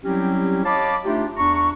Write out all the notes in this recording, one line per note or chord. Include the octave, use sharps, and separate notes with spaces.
F#3 G3 C4 C#4 E4 G4
C#5 D#5 F5 A5 B5 D6
A3 D4 D#4 F4 G4
E2 D4 A#5 C#6